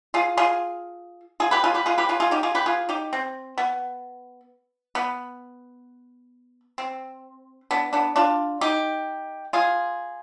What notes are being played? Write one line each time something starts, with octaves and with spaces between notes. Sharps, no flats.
F4 G#4
F4 G#4
F4 G#4
G4 B4
F4 G#4
G4 B4
F4 G#4
G4 B4
F4 G#4
F4 G#4
D#4 G4
F4 G#4
G4 B4
F4 G#4
D#4 G4
C4
B3
B3
C4
B3 D4
B3 D4
D4 F4
D#4 G4
F4 G#4